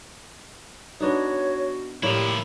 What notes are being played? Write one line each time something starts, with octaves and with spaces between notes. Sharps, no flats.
B3 D4 D#4 F#4 C#5
A2 F3 A#3 E4 G4 D5